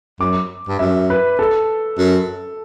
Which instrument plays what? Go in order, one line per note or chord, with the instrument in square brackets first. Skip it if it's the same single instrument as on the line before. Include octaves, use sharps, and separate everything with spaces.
[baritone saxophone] F#2 [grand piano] D6
[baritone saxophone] G2
[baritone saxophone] F#2 [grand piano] E5
[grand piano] B4
A4
[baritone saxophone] F#2